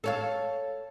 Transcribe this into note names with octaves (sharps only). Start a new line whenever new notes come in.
A4 C#5 F5